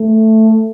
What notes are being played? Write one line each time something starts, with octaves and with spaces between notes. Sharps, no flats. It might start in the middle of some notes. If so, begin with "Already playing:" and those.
Already playing: A3